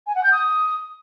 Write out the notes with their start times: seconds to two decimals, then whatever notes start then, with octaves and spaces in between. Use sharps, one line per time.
0.07 G#5
0.15 F#5
0.24 G6
0.32 D#6